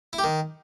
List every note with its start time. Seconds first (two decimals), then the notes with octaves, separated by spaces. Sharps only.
0.13 E4
0.18 G4
0.24 D#3